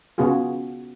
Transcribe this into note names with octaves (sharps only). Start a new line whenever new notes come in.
C#3 B3 F4 F#4 G#4